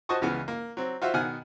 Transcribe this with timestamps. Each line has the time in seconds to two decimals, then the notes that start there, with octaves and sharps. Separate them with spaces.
0.09 F#4 C5 D#5 A5 C#6 D#6
0.22 C#2 C#3 E3 B3 F6
0.48 A#3
0.77 F#3 C4
1.02 F4 F#4 C5 E5 F5
1.14 B2 D#3 F#5 G#5 F6